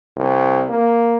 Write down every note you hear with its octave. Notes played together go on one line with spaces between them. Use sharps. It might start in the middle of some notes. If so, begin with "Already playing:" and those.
C2
A#3